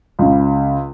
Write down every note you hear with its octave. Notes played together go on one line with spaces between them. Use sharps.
C#2 C#3